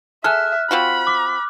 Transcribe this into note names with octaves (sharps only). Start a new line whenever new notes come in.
G#4 A4 E5 F6 F#6
C4 F4 F#4 B5
D6